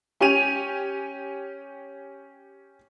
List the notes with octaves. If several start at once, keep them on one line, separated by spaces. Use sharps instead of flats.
C#4 G4 G#5 D#7 F7